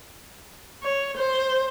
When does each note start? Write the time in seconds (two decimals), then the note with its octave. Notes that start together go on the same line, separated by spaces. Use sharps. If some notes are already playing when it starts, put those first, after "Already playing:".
0.83 C#5
1.17 C5